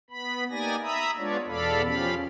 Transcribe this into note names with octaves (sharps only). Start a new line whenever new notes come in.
B3 B5
A#3 D#4 G4 D5 G#5 A#6
E5 A#5 B5 D#6
G#3 B3 D4 F4 C#5 D5
E2 B2 A4 D5 F5 B5
F3 C#4 G4 F5 B5